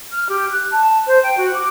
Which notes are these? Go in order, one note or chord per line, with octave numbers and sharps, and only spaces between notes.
F6
G4
F#6
A5
C5
G5
F#4
D6